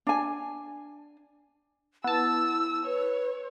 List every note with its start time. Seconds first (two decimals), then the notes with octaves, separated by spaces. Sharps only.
0.07 D4 G#5
2.04 B3 E4 A5 E6
2.85 B4 C#5